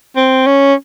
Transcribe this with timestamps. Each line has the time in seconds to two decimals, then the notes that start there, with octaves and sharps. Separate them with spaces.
0.16 C4
0.46 C#4